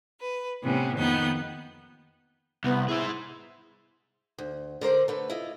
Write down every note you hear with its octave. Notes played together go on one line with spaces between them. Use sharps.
B4
A2 C3 E3 B3 C#4
F2 D#3 A#3 B3 D#4 G6
C2 B3
E4 G#4 C5
D2
D3 A#4 C5 D5
D3 A3 B4
E4 F4 D#5